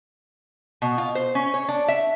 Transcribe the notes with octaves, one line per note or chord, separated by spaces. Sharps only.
B2
F4
C5
C#4
C#5
D4
E5